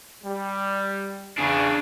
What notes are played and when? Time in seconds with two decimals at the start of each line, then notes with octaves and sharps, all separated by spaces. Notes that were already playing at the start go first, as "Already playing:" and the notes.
0.24 G3
1.38 E2 C#3 D4 G#4